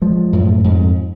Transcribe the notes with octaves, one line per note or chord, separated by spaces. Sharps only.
F3 G#3
F#2 A2
F2 G#2